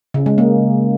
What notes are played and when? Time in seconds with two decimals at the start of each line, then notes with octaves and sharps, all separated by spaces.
0.14 C#3
0.26 G#3
0.38 A#3